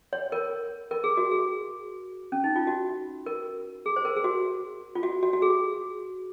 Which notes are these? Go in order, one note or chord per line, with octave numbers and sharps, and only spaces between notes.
C#5
A#4
A#4
G#4
F#4
G#4
C#4
D#4
F4
F#4
A#4
G#4
C5
A#4
G#4
F#4
F4
F#4
F#4
F#4
G#4